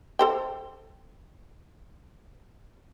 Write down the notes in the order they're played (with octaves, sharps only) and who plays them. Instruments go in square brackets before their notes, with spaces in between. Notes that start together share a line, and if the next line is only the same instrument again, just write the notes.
[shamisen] A4 C5 G5